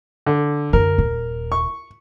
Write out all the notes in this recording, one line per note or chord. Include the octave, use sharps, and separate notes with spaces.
D3
F#2 D3 A#4
D#1
C#6